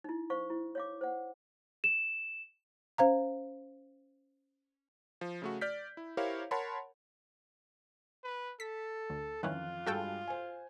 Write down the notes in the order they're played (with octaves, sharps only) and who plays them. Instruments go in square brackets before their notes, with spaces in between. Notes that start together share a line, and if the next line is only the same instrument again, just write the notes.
[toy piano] D#4 E4
C5 F5 C#6
E4
C#5 F5 D6
C5 F#5
[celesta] E7
[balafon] C#4 C5 F5 A#5
[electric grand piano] F3
C#3 A3 F#4
D5 F6 G6 B6
E4
E4 G4 A#4 C5 C#5 F5
A#4 C#5 F#5 A5 B5 C6
[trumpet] B4
[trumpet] A4 [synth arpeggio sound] B6
[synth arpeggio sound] D2
[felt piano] F2 F#6 [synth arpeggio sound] D#3 E3 C#4 [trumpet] F4
[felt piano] G2 G#3 [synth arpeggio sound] F#4 A4 G5
[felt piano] C5 G#5